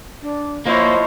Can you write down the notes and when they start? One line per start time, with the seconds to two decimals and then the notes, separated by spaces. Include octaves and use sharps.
0.22 D4
0.66 F3 A#3 E4 C5 C#5 D#5